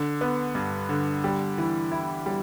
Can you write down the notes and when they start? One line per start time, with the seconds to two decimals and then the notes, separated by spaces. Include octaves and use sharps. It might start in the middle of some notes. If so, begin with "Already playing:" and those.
Already playing: D3
0.21 B3
0.55 G2
0.89 D3
1.24 G3
1.58 E3
1.92 E4
2.26 G3